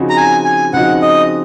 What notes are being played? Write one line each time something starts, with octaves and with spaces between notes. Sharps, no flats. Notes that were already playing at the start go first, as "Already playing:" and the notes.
Already playing: C#3 F3 C4 D#4 F#4
A#5
G#5
G#5
C#3 F3 C4 D#4 F#4 F#5
D#5